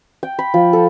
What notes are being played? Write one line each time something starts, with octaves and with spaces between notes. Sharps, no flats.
G5
B5
F3
A4